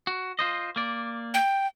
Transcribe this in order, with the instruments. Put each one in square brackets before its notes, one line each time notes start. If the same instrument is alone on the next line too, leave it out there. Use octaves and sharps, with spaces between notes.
[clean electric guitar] F#4
F4 C5 D#5
A#3 D5
[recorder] G5